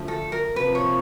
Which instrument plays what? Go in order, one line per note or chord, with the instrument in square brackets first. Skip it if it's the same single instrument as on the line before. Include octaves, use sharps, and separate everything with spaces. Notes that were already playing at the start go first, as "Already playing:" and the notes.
Already playing: [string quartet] D3 F3 A3
[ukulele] A4
A#4
[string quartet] C3 F3 A#3 [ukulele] B4
[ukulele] C#5